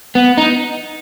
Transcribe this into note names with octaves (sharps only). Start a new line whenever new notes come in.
B3
D#4